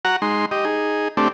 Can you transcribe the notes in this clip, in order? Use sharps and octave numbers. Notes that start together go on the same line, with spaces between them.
F#4 F#5 A#5
G#3 D#4 C6
G4 D#5
D#4 G#4
A3 C4 D4 G4